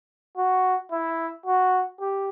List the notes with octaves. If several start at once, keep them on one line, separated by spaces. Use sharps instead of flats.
F#4
E4
F#4
G4